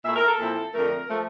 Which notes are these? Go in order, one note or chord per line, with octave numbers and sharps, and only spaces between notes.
A#2 A3 E4 E5
A#4
A4
A#2 F3 C4 E4
F2 D3 A3 A#4
F3 A3